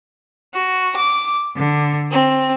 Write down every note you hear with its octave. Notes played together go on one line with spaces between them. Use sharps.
F#4
D6
D3
C4